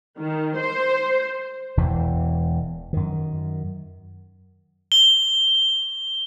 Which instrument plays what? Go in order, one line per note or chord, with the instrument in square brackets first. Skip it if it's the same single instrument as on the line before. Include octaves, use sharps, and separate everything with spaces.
[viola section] D#3
C5
[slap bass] E1 E2 E3
F#2 D#3
[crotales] G7